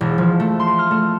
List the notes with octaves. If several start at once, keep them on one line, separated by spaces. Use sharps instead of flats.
E1
F3
A3
C6
F6
A3